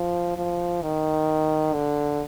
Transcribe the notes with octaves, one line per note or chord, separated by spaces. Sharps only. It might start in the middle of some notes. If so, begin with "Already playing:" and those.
Already playing: F3
F3
D#3
D3